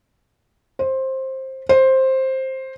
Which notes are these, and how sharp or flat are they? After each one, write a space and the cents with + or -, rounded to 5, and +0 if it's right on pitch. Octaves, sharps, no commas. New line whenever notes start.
C5 +15
C5 +10